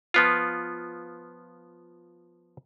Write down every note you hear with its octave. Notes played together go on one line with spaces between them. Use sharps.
F3 B3 F4